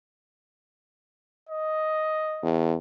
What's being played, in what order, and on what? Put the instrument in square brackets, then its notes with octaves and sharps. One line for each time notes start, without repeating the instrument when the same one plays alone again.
[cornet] D#5
[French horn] E2